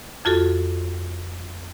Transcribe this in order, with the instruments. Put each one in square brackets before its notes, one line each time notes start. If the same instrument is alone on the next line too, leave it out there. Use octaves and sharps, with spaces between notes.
[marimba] F2 F4 F#4 A4